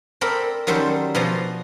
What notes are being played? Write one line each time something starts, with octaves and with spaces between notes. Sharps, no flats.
C4 A4 A#4 D5 B5
D#3 F#3 G3 C#4 A4 C5
B2 F3 C5 D5 G#5 A#5